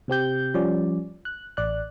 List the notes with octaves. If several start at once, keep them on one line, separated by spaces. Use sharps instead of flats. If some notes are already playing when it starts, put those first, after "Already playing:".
C3 C4 G4 G6
F3 G3 C#4 D5
F#6
A1 D5 F#6